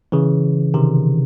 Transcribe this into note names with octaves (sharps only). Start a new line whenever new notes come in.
C#3 E3
C3 D#3